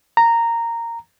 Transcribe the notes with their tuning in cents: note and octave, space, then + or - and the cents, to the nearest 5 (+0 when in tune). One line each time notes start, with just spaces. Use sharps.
A#5 -10